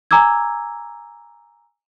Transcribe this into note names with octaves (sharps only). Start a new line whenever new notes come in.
G#5 A#5 D6 E6 G#6